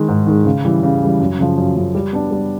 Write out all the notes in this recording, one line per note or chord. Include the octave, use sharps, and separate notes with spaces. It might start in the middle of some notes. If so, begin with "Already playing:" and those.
Already playing: D#3 G#3
G#2
D#3 G#3
C#3
E3 G3
C#3
E3 G3
F#2
C#3 F3
F#2
C#3 F3
G3
B3 D4
G3